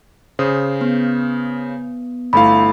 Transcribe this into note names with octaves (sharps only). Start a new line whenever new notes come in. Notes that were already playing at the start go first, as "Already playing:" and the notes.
C#3 C5 D#6
B3
G1 A3 E4 F5 B5